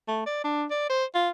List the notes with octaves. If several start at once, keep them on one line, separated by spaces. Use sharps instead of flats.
A3
D5
D4
D5
C5
F4